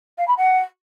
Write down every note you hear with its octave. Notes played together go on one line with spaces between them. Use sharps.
F5
B5
F#5